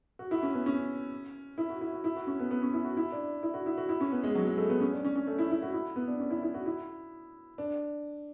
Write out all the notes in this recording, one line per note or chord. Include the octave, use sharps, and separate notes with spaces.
F#4
E4
C#4
B3
C#4
E4
F#4
E4
F#4
E4
F#4
C#4
B3
B3
C#4
E4
F#4
E4
D4
E4
F#4
E4
F#4
E4
C#4
B3
G#3
F#3
G#3
A3
B3
C#4
D4
C#4
C#4
A3
E4
E4
F#4
E4
B3
D4
C#4
E4
E4
F#4
E4
D4